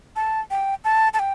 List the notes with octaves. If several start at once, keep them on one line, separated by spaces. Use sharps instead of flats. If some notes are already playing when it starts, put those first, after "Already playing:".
A5
G5
A5
A5
G5